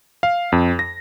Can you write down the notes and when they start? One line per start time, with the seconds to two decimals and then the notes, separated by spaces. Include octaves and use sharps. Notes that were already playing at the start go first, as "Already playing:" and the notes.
0.23 F5
0.52 F2
0.79 A#6